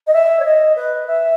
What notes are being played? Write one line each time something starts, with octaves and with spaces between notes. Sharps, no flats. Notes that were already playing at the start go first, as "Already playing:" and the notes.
D#5
E5
C#5
D#5
B4
E5